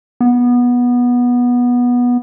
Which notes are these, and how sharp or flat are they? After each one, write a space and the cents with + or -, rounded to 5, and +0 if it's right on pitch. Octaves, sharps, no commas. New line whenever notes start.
B3 -15